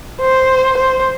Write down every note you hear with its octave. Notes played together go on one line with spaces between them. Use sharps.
C5
C5